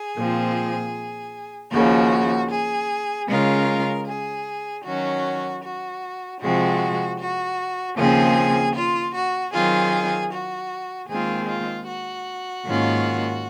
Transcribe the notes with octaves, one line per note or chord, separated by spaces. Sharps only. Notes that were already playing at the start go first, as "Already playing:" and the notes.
Already playing: G#4
A#2 F3 C4
D#2 C#3 F3 F#4
G#4
C#3 G#3 C#4 F4 A#4
G#4
D#3 F#3 C#4 F#4
F#4
C3 F3 G#3 C4 F#4
F#4
D#2 C#3 F3 C4 G#4
F4
F#4
D#3 F#3 C4 F4 G#4
F#4
D#2 D#3 G#3 C4 F4 G#4
F4
F#4
G#2 D#3 A#3 C#4 F4